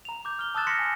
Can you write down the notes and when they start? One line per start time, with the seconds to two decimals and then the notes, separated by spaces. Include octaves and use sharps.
0.05 A#5 F7
0.25 D6 G6
0.39 F6 G7
0.55 A5 D#6 E6 F#6 A6 E7
0.67 C6 F6 A#6 B6 C#7
0.79 G#5